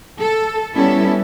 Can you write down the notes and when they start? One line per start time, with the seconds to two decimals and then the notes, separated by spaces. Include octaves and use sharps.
0.19 A4
0.74 G3 B3 C#4 E4 A4